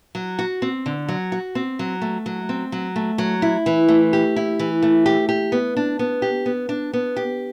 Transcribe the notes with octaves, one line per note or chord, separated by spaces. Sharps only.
F#3
F#4
C4
D3
F#3
F#4
C4
F#3
A3
F#3
C4
F#3
A3
F#3
E4
E3
A3
G4
E4
E3
A3
G4
G4
B3
D4
B3
G4
B3
D4
B3
G4